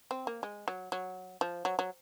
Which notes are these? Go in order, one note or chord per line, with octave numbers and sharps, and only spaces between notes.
C4
A#3
G#3
F#3
F#3
F3
F#3
F#3